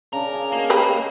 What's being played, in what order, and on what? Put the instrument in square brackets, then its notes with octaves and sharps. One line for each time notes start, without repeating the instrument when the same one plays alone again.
[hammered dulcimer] C#3 D4 A5 [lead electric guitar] A#4
[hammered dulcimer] G#4 F5
[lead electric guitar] A#3 [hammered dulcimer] F#4 D#5 C#6
[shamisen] G4 G#4 B4
[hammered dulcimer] C#5 F5